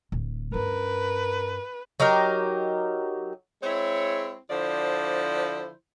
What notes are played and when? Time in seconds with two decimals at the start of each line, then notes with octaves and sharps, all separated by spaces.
0.12 D1
0.54 G2 C#4 A#4 B4
2.00 F#3 D#4 G4 A#4
3.63 G#3 C4 E4 C#5
4.50 D3 F3 E4 C5 D5